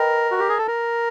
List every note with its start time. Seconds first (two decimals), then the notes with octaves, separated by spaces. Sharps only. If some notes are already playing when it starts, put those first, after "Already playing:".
Already playing: A#4 B4 D#5 G5 B5
0.31 F#4
0.39 G4
0.49 G#4
0.58 A4
0.67 A#4